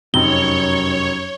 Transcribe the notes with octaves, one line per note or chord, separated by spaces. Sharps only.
F1 F#2 C4 D#4 C#5 G7